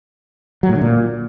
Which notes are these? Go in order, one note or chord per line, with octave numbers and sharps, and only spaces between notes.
F#3
A2
D3
A#2